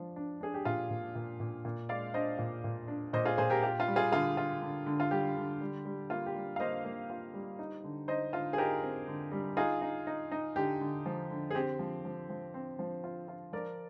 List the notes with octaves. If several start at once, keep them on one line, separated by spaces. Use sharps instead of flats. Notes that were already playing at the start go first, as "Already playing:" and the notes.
Already playing: F3 D4
D4
D4 G#4
G4
A#2 F4
A#2
A#2
A#2
A#2
G#3 D5 F5
D4 C5 D#5
A#2
A#2
D4
A#2 C5 D#5
F4 G#4
A#2 G#4 C5
G4 A#4
F4 G4
F4
G3
F4 G#4
D3 F4 G#4
F4
D3
D3
F4
G3 G4
D3
G3
G3
A#3 F4
G4
G3
F5
A#3 C5 D#5
A#3
F4
G3
D#4
D3
D#4 C5 D#5
D3 F4
G#4
D#4 G4 A#4
C4
D3
G3
D#4 F4 G#4
D#4
D#4
D#4
D3 G4
D3
F3
D3
G#4
C4 G4
F3
F3
F3
C4
F3
F4
F4
F3 A#4 D5